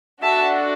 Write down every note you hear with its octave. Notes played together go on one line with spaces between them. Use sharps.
D4 F#4 A4 E5 A5